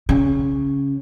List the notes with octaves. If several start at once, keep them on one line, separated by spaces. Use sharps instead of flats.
C#3